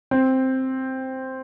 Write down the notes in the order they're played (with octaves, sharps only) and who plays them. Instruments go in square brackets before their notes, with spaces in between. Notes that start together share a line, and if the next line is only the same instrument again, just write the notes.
[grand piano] C4